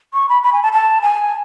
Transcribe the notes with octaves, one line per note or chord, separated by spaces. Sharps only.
C#6
B5
B5
G#5
A5
A5
G#5